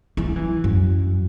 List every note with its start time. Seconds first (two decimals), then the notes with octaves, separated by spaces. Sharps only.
0.17 E3
0.26 F#3
0.36 E3
0.64 F#2